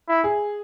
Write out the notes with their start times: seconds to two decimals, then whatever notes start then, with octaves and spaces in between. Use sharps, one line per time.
0.08 E4
0.24 G#4